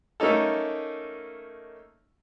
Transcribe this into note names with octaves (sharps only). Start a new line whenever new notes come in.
A3 A#3 C#4 D#4 A4